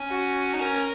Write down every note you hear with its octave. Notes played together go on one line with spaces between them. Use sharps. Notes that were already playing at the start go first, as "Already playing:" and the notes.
Already playing: C#4
F#4
D#4
C#4 A#4